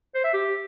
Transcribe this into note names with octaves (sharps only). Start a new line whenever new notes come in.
C5
E5
G4